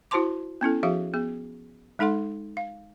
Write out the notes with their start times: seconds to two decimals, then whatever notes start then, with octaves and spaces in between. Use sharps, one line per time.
0.11 E4 F#4 C5 A5 C6 D6
0.61 B3 C#4 E4 A4
0.83 F3 F#4 G#4 E5 F5
1.14 B3 G#4
1.99 G#3 D#4 A4 F#5 C6
2.57 F5